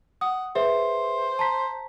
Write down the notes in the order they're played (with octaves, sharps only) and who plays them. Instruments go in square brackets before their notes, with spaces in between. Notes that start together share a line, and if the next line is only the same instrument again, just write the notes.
[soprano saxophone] F#5 [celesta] D#6
[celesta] G#4 B4 E5 [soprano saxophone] C5
[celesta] A5 A#5 B6